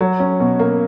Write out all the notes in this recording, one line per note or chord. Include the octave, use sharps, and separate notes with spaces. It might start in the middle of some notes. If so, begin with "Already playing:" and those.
F#3
C#4
B2
A#3